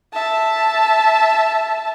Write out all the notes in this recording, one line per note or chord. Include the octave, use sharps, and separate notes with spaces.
E5 A5